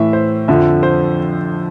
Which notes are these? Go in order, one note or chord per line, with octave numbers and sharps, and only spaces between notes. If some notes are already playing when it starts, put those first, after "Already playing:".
Already playing: A2 E3 E5
C5
F2 D3 F3 E5
C5